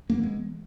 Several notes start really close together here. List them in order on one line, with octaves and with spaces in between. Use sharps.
A#3 B3 E3 G#3